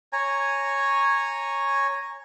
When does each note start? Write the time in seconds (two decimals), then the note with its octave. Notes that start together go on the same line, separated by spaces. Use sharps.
0.13 C#5 G#5 A#5